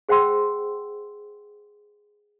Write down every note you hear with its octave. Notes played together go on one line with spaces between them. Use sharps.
G#4 C5 F#5 G5 C6 E6